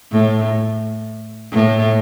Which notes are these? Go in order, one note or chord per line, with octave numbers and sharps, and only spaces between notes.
A2
A2